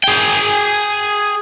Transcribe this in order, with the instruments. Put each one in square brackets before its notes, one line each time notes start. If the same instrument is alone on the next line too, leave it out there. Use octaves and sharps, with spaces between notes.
[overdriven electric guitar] G#4 G5